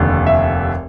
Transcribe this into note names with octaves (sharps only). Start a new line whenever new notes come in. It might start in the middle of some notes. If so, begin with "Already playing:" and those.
Already playing: F1 D#2 D3
E5